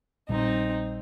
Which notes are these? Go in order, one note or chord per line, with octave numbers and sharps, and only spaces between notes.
A#1 A#2 G3 C4 D#4